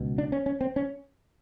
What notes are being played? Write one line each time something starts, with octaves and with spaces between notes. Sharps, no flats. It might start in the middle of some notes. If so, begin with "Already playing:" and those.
Already playing: C#2 B2
D4
C#4
C#4
C4
C#4